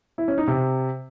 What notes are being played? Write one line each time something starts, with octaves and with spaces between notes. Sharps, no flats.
E4
C#4
D#4
C3